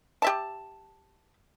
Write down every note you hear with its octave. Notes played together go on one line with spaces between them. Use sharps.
G4 E5 A5